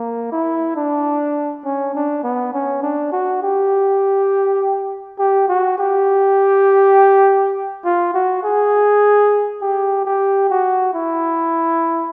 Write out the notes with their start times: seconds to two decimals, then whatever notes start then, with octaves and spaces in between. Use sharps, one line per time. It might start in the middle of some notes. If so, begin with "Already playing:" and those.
Already playing: A#3
0.32 E4
0.76 D4
1.65 C#4
1.95 D4
2.24 B3
2.54 C#4
2.83 D4
3.12 F#4
3.43 G4
5.19 G4
5.48 F#4
5.78 G4
7.85 F4
8.14 F#4
8.44 G#4
9.62 G4
10.05 G4
10.50 F#4
10.94 E4